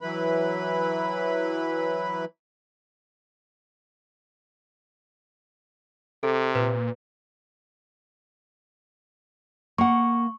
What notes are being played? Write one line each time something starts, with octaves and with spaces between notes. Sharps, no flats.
E3 F#3 E4 B4 B5
C3 A4
A#2 B4
A#3 F#5 C#6